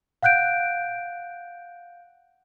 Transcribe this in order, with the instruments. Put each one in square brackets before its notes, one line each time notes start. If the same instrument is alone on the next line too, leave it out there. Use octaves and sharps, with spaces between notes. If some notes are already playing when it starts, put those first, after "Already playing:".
[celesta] F5 F#5 F#6 G6 D7